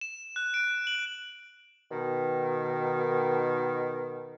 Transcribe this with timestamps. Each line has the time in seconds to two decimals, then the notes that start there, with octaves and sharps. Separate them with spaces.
0.01 E7
0.36 F#6
0.54 D7
0.87 F#7
1.92 B2 D#3